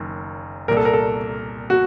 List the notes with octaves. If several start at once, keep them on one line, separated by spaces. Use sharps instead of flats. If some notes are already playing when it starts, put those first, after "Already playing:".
Already playing: F#1 F#2 D#3
C2 A#2 A#4
A4
A#4
A4
F#4